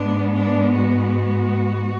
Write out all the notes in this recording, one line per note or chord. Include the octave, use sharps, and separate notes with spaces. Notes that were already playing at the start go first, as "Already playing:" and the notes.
Already playing: G#2 G#3 B3 D4
D4
F#4